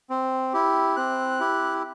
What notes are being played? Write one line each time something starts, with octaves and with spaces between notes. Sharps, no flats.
C4
E4 G4
C4 F#6
E4 G4